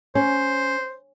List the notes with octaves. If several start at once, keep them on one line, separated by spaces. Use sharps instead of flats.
C#4 C5